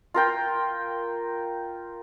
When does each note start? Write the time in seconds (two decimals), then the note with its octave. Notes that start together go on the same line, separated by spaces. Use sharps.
0.14 F4 A#4 G5